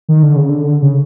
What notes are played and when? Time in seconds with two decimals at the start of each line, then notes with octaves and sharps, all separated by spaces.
0.09 D#3
0.23 D3
0.36 C#3
0.50 D3
0.82 C#3